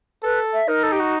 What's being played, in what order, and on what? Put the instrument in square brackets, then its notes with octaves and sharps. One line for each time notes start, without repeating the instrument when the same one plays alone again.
[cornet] A4 [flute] B4
[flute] E5
[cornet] D#4 [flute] A#4
[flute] A4
G4
F#4